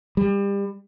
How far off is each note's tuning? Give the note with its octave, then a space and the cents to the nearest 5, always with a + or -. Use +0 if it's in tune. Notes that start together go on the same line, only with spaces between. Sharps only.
G3 +30